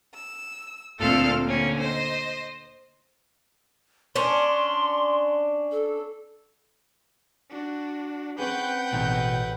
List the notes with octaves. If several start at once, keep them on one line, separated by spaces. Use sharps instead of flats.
E6
D2 A#2 C4 A4 F5 F6
D3 A#3 C4 C#4
C5 D#5
C#4 D4 C6
A4
D4 F#4
C4 C#4 G#4 B4 F#5 G5 G6
A1 B2